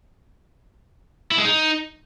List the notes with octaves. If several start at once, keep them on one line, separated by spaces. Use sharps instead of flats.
E4
G#3
D#4